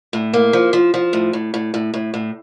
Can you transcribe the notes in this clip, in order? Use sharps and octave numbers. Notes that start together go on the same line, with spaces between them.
A2
A#3
F3
F3
F3
A2
A2
A2
A2
A2
A2